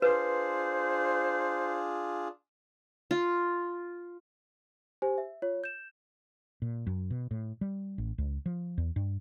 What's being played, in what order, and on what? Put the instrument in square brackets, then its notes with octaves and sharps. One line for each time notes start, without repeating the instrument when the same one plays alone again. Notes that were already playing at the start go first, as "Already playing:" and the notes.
[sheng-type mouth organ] D4 F4 G#4 [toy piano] B4 [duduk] C5
[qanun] F4
[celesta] G4 C5 G#5
E5
F4 C#5
G6 E7
[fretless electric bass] A#2
F#2
B2
A2
G3
A1
C#2
F3
E2
G2